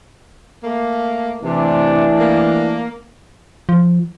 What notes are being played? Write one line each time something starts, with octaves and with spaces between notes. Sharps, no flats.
A3 A#3
C3 E3 A3 D4
A#3
F3